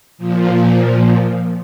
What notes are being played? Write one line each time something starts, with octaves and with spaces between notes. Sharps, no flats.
A#2 F3